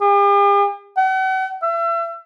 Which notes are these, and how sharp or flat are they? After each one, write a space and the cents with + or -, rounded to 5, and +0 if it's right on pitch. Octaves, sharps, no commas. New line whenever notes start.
G4 +45
F#5 +40
E5 +35